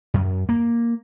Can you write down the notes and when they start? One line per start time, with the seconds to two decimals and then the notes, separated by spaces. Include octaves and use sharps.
0.14 F#2
0.49 A#3